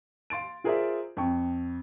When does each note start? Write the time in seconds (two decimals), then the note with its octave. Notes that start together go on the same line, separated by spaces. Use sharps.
0.30 F5 C6 A6 D7
0.64 F4 G#4 A#4 C5 D5 E5
1.17 F2 G5 C#6